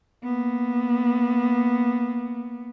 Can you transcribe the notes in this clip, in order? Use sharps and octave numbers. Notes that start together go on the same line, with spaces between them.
A#3 B3